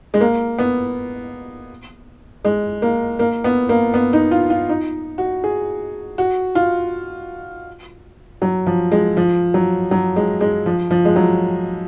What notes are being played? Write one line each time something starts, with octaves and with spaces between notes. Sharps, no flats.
G#3
A#3
B3
G#3
A#3
A#3
B3
A#3
B3
D#4
F4
F4
D#4
F#4
G#4
F#4
F4
F#3
F3
G#3
F3
F#3
F#3
G#3
G#3
F3
F3
G#3
F#3